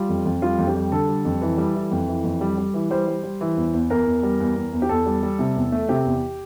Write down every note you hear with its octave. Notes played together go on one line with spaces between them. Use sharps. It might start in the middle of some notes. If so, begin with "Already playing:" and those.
Already playing: G3 F4
F2
F2
G3 F4
F2
G4
G3
D3 A4
G3
F2
E3
G3
E3
F2
E3
F2
G3
G3
E3
G3 C5
G3
G3
E3
E2
E2
E2 A#4
E2
G3
E2
E2
E2
G4
E2 A4
G3
G3
C3
E2
A3
C3 G4
E2